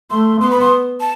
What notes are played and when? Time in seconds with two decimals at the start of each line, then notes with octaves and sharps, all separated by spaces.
0.10 A3 C6
0.40 B3 C6
0.50 B5
0.60 C6
1.00 A5